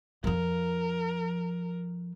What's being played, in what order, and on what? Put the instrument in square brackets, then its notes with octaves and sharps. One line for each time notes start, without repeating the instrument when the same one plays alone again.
[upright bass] F2 F3 [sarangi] A#4